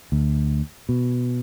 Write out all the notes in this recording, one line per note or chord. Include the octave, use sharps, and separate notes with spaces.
D2
B2